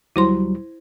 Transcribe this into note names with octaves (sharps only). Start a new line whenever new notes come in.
D2 F#3 G3 E4 C5 C6